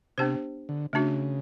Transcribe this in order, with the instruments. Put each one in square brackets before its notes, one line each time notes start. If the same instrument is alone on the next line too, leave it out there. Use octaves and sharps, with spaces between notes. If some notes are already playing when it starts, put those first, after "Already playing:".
[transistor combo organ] C3 [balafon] B3 D4 G4 C5
[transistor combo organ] D3
[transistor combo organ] C#3 [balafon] A3 D4 F#4